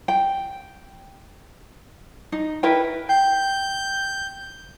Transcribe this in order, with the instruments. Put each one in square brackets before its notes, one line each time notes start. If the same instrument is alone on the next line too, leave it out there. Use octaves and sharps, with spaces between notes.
[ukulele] G5
D#4
E4 A#4 B4 G5
[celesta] G5 [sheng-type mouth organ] G6